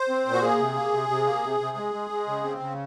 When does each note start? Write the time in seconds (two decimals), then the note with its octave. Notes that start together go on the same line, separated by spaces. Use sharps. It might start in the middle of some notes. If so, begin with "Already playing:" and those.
Already playing: C5
0.09 C4
0.26 A#2
0.33 F#4
0.42 A#3 G#4
0.59 C3
0.75 A#3
0.93 C3
1.09 C3
1.26 A#3
1.44 C3
1.60 C3
1.77 G#3
1.94 G#3
2.10 G#3
2.27 C#3
2.44 C4
2.60 C#3